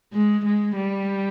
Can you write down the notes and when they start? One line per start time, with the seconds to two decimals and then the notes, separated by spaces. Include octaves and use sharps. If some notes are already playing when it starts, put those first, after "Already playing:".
0.13 G#3
0.45 G#3
0.76 G3